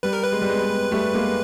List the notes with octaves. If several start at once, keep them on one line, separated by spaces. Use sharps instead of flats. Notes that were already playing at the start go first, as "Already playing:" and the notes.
G3 B4
A#4
B4
G#3
G3
G#3
G#3
G3 A3
G#3 A#3